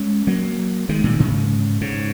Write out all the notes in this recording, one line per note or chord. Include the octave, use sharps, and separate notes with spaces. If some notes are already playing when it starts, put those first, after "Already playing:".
Already playing: G#3 C#4
F#3 A#3
D#3 G#3
A#2 D#3
G#2 C#3
G#2 C#3